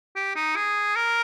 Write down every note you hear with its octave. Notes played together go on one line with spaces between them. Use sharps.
G4
D#4
G#4
A#4